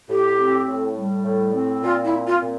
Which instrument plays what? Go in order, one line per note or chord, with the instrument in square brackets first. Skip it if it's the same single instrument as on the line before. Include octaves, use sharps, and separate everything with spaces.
[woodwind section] A2 [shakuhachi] G4
[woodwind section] C4
A2
G3
A2
C4
[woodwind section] A#2 [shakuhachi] F4
[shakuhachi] E4
[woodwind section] C4
[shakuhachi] F4
[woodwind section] A#2